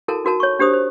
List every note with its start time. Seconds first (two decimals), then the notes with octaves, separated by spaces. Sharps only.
0.08 E4 F#4 A4 A#4 A5
0.25 D#4 F#4 A#4 A5
0.40 C#5 C#6
0.59 D4 G4 C5 D#6
0.73 C5